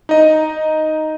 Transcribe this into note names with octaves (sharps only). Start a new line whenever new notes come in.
D#4 D#5